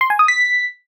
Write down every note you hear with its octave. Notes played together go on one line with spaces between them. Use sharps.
C6
G#5
D#6
B6